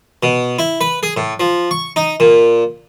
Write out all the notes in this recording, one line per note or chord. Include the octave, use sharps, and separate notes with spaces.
B2
E4
B4
G#4
A2
F3
C#6
D#4
A#2